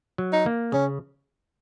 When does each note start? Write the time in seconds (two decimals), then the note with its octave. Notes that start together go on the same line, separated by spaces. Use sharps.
0.18 F#3
0.33 D#4
0.46 A#3
0.72 C#3 C#4